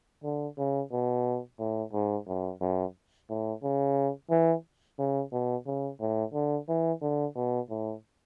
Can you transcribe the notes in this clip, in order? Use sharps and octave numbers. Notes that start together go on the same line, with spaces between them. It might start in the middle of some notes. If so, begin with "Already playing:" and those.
D3
C#3
B2
A2
G#2
F#2
F#2
A2
C#3
E3
C#3
B2
C#3
A2
D3
E3
D3
B2
A2